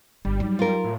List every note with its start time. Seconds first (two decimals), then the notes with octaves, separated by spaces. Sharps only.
0.25 G1 G3
0.40 F#3 D#4
0.59 F4 A#4
0.84 A2